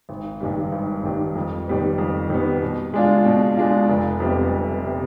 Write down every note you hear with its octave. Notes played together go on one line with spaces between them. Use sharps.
G#1
G2 D#3 G3
G#1
G2 D#3 G3
F2
D#3 G3 B3
F2
D#3 G3 B3
B2
G#3 D4 F4
B2
G#3 D4 F4
F1
F2 C3 G3 B3
F1
C3 G3 B3